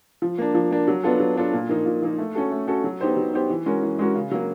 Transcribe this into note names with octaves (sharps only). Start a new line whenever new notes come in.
F3
A#3 D4
F3
A#3 D4
F#3
B3 D4 F4 A4
F#3
B3 D4 F4 A4
A#2
F3 A#3 D#4
A#2
F3 A#3 D#4
A3
C#4 F#4 A4
A3
C#4 F#4 A4
F#3
B3 D#4 G4 C5
F#3
B3 D#4 G4 C5
E3
G#3 C#4 F#4 A#4
E3
G#3 C#4 F#4 A#4
C#3
F#3 A#3